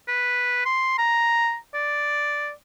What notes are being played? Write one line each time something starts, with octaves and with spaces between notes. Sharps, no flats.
B4
C6
A#5
D5